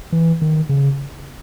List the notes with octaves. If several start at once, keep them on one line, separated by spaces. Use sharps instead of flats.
E3
D#3
C#3